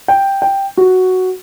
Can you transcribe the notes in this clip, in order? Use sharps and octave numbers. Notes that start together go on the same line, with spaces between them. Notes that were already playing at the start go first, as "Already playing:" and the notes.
G5
G5
F#4